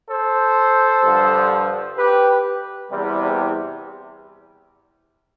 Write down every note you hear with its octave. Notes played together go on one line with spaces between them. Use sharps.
A4 C5
G2 D3 F3
G4 B4
E2 C3 G3